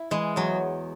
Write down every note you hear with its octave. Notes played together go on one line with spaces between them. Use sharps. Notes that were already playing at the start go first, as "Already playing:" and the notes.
Already playing: E4
E3 G#3
E2 F#3